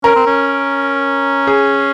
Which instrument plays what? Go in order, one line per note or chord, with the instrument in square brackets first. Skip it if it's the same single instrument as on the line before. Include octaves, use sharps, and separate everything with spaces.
[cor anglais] C#4 [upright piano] A#4
[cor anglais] C4
C#4
[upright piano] G#4